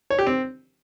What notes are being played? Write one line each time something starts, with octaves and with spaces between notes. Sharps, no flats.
C#5
G4
C4